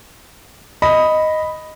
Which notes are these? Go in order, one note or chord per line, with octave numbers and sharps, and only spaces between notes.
D#5 B5